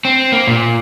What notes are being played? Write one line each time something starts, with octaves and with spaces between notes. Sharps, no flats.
C4
A#3
A#2